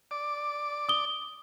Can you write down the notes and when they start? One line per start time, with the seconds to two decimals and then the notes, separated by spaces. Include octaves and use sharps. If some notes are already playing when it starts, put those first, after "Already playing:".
0.11 D5 D6
0.89 D#6 G7